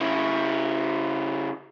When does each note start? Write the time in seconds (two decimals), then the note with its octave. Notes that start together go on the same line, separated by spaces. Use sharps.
0.01 C#3 E4